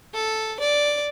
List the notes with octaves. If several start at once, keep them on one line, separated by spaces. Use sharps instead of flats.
A4
D5